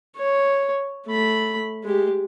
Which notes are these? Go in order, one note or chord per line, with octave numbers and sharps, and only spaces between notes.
C#5
A3 B5
G#3 G4